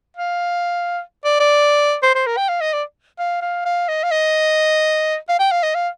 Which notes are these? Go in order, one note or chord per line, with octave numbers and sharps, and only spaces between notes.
F5
D5
D5
C5
C5
A#4
G5
F5
D#5
D5
F5
F5
F5
D#5
F5
D#5
F5
G5
F5
D#5
F5